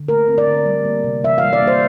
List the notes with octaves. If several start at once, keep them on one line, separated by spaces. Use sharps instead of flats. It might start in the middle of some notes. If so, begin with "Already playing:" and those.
Already playing: D3
A3 A#4
C4
D5
D3
G3
A#3
C3
E3 E5
F5
G3
D5
A#3 C5